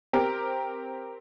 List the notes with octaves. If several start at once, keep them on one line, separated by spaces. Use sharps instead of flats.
C4 G4 A#4